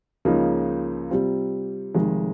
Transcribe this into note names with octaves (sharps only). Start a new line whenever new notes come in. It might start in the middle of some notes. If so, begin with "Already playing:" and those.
C#2 C#3 F3 A#3 D#4
C3 G3 C4 F4
F1 F2 D#3 G#3